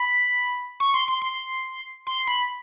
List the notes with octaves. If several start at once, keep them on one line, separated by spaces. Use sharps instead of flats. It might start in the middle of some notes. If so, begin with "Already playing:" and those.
Already playing: B5
C#6
C6
C6
C6
C6
B5